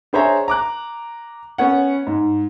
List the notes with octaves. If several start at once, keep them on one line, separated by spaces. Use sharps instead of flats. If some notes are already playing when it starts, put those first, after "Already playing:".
D4 G#4 C5 C#5 E5 A#5
A#5 D6 F#6
B3 C#4 F#5
G#2